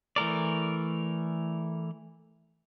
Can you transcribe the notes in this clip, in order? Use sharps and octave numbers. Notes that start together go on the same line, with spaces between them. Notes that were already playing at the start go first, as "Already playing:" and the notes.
E3 A3 A#4 D5